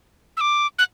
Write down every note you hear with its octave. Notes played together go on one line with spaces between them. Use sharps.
E6
D6
F#6